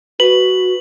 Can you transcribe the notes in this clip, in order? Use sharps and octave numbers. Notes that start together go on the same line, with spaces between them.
F#4 B4 F#7